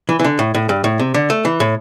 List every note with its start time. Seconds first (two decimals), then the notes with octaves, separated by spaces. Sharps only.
0.09 E3
0.20 E3
0.24 D3
0.39 A2
0.55 A2
0.69 G2
0.84 A2
0.99 C3
1.14 D3
1.30 A3
1.45 E3
1.60 A2